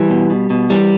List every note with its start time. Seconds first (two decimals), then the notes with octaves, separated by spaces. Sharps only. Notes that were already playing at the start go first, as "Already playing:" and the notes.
Already playing: E3 G3
0.10 B2
0.30 B2
0.50 B2
0.70 E3 G3